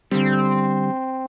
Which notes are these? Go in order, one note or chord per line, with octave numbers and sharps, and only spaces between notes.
D3 G3 C4